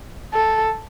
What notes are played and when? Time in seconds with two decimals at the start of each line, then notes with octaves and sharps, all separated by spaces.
0.34 A4